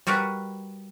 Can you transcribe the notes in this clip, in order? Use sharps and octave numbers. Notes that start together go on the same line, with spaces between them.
G3 F#4 A#4 B4